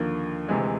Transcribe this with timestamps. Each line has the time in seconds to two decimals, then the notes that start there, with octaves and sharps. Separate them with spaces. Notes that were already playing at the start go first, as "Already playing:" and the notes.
Already playing: D#2 D3 F3 A#3
0.48 D2 C3 E3 G#3